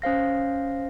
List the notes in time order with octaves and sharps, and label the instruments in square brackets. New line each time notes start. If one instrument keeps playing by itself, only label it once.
[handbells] C#4 C5 F5 A#6